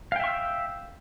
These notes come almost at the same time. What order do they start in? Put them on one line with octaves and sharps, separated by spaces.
F5 G5 E5 C#6 E6